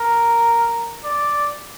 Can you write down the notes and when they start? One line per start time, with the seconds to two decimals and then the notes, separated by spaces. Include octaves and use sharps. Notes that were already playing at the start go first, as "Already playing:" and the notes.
Already playing: A#4
1.05 D5